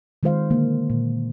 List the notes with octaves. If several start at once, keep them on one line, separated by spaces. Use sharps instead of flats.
D#3 G#3 F4 C5 F5
D3 A#3
A#2